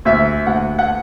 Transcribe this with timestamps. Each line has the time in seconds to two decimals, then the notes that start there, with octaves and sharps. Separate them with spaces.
0.05 D2 E5
0.46 D2 F#5
0.79 F#5